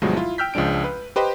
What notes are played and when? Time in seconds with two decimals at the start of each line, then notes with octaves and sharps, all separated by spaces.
0.02 D2 G2 B2 F3 F#3 G#3
0.16 E4 F4
0.38 G5 E6 F6 G6 B6
0.54 C#2 F3 G#3 D4 D7
0.84 B4
1.16 G4 B4 C5 D#5 G5